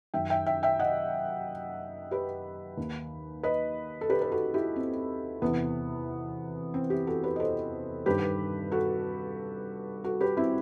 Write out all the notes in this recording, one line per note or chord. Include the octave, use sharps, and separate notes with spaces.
F#2 D#3 E5 G5
E5 G5
E5 G5
E5 G5
D#5 F#5
G4 B4
D#2 D#3
B4 D#5
A4
G4 B4
B4
F#4 A4
E4 G4
C4
E2 C3 E3 B3
C4
E4 G4
F#4 A4
G4 B4
D#5
A4 C5
G2 D#3 G4 B4
F#4 A4
F#4 A4
G4 B4
C4 E4